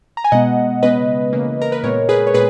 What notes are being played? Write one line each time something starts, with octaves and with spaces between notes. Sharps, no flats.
A#5
G#5
B2 G#3 B3 D#5 F#5
C#3 G#3 B3 B4 D#5
C#3 E3 A#3
A#4
B4
A#2 G#3 B3 A#4 C#5
G#4 B4
C#5
A#2 G#3 B3 G#4 B4